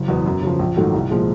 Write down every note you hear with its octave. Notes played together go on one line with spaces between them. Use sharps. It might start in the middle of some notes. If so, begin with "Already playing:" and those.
Already playing: F#1
E2 B2 F#3 B3
F#2
C#3 F3
A#1
G#2 D#3 F#3 A3
C2
A#2 F3 G#3